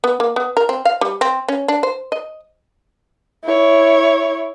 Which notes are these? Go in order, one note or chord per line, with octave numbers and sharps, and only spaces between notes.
B3
A#3
B3
A#4
C4
F5
G3
C4
C#4
D4
C5
D#5
E4 C#5